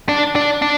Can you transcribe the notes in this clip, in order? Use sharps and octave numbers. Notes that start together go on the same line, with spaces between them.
D4
D4
D4